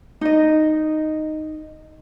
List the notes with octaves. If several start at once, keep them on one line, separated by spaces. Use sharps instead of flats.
D#4 D#5